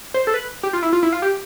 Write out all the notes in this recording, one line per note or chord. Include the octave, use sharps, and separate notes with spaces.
C5
A4
B4
G4
F4
E4
F4
E4
F4
G4